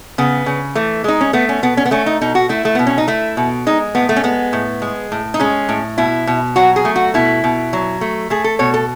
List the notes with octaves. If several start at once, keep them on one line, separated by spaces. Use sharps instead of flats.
C#3 B3
C#3
E3 A3
G#3 D#4
C#4
A3 B3
C#4
B2 B3
C#4
B3
A3 C#4
D#4
B2 D#4
F#4
A3 E4
A3
B2 B3
C#4
D#4
A3 E4
B2
G#3 D#4
A2 B3
A3
C#4
G#3 B3
A2
G#3
A2
D#4
G#3 C#4
A2
B2 E4
B2
F#3 F#4
G#4
A3
F#4
B2 E4
B2
F#3
A3
A3 G#4
A4
B2 C#5
A4